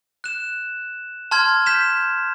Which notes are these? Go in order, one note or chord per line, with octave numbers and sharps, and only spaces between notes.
F#6 E7
A5 C6 F6 G#6
G6 B6 E7